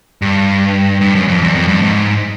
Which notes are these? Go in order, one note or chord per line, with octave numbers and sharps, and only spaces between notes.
G2
G2
F#2
F2
E2
F2
G2
G#2